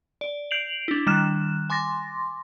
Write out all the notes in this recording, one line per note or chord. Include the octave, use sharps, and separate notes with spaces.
D5
G6 C7 D7 F7 F#7
D4 E4
D#3 G3 F6 F#6 E7
G#5 C6 D6 A6 A#6